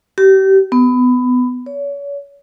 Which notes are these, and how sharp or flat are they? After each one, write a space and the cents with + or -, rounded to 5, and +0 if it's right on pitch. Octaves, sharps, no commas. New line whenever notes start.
G4 -30
B3 +20
C#5 +35